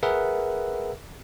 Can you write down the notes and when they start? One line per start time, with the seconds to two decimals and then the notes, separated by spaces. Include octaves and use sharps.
0.03 G#4 A#4 B4 E5 F#5